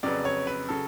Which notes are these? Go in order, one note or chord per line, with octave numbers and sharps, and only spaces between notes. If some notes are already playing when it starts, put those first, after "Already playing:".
F2 C#3 F#3 B3 D5
C#5
B4
C#3 F#3 A4